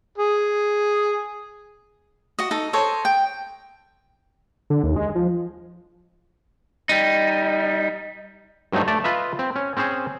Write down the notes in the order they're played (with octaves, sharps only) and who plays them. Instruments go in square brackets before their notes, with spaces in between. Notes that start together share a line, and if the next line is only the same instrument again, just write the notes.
[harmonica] G#4
[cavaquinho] F#4 D#5
D#4 A4
A4 C5 C#5 D#5
G5
[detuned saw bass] D3
D#2
G#3
F3
[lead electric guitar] G3 D#4
[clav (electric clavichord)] G2 F#3 A3 D#4 C5
A3 D5 A5
F4 B4 D#5 E5
C4
C#4
C4 C#4 G#4 C5